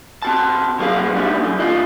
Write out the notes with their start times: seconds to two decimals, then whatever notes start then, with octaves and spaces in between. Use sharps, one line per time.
0.22 C4 F#4 A5
0.78 C3 F#3 A#3 B3 G#4 F5
1.02 A#2 F#3
1.15 G3 A3 B3 D4 D#4
1.43 F#2 A3
1.59 D#2 D4 F4 D#5